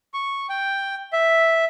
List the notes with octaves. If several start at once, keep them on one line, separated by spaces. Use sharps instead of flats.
C#6
G5
E5